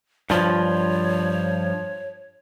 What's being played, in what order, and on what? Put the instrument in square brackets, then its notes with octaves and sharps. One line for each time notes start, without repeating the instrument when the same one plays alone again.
[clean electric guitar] G2 F3 [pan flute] C#5